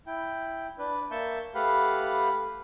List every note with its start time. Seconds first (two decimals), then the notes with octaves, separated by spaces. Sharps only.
0.07 E4 G5
0.78 D4 B4
1.11 A#3 E5 A5 C#6 G6
1.55 A3 G4 B4 F5 F#5 B5